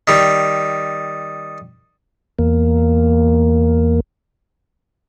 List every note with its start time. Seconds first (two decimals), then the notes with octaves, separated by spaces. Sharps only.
0.08 D#3 G3
2.39 E2 A#3